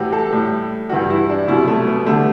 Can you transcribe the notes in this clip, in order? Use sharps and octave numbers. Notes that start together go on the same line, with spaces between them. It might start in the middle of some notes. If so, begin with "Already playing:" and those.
Already playing: A2 E3 G3 F#4 G4
A4
A2 G3
G2 E3 G3 F#4
E4
D4
C2 B2 F#3 E4
A3
B3
D3 G3 A3